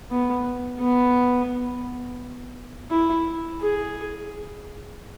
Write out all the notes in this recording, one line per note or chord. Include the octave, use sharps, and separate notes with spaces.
B3
B3
E4
G#4